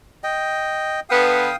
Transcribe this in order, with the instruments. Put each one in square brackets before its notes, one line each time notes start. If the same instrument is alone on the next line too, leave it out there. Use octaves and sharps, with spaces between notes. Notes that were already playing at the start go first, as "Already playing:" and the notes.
[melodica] D#5 G5
[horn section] D3 B3 [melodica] F5 G5 D#6